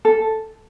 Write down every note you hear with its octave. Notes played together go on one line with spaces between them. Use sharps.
A4